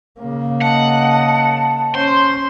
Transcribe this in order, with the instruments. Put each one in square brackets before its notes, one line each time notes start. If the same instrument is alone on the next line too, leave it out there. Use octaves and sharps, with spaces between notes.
[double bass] C#3 A#3
[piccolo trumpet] D#5 [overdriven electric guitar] F#5 [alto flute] A5
[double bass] C#4 [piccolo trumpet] C5 [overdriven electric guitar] C6